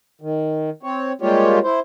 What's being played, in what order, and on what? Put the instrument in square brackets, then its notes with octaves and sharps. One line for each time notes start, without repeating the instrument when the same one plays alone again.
[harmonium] D#3
C4 C#5
G3 G#3 A#3 F4 G4 C#5
E4 C5